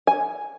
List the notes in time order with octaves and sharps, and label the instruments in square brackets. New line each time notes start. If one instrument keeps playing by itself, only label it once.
[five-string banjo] G#5